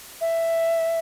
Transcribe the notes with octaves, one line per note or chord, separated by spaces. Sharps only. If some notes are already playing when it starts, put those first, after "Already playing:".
E5